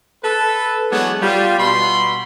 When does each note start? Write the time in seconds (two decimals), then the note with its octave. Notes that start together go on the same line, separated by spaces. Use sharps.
0.24 A4 B4
0.91 E3 F#3 G#3 B3 D4 F#4
1.22 G3 F4
1.59 B2 B5 C6